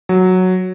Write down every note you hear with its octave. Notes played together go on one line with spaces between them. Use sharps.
F#3